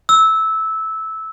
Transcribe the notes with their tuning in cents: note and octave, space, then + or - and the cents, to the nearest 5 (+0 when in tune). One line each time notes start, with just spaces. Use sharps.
E6 -15